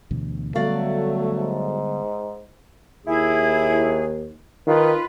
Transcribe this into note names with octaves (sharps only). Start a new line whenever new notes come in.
D2 B2 E3
D3 F#3 G3 A3 B3 F#4 D5 F5
G#2
D#2 E4 G#4
D#3 F4 B4